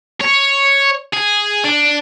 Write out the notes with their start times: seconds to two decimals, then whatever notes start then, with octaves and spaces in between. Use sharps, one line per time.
0.21 C#5
1.14 G#4
1.64 D4